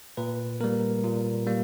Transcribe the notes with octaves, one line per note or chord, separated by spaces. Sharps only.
A#2 B4
G3 A#3 A#4
A#2
G3 A#3